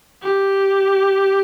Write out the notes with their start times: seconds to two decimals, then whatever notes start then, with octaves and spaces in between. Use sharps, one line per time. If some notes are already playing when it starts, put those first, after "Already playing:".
0.22 G4